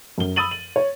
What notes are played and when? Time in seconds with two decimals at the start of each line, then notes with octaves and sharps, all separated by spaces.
0.18 F#2 G7
0.36 B5 D#6 E6 A6 D#7 F#7
0.51 F#7
0.76 C#5